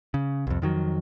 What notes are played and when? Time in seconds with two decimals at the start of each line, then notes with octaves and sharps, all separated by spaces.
0.14 C#3
0.47 C2 F2
0.62 F2 D#3 F#3